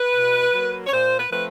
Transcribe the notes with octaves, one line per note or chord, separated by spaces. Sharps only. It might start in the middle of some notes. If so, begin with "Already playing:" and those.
Already playing: B4
B2
F#3 A#3
C#5
A#2 C5
B4
F3 A3 C4 B4